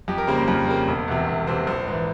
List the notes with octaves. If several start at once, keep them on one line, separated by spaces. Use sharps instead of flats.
F2 G4
A#4
C#3 G3 A#3 C5
C5
F2
C#3 G3 A#3
E1
E2 C3
E1
E2 C3 C5
A#1 C5
G#2 E3 C5